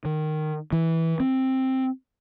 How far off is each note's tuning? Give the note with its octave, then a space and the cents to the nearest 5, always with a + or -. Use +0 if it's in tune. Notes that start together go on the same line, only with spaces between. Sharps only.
D#3 -15
E3 -10
C4 +5